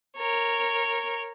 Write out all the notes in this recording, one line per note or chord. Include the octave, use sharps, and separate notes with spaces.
A#4 C#5